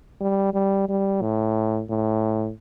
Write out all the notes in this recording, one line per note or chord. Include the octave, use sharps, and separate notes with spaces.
G3
G3
G3
A2
A2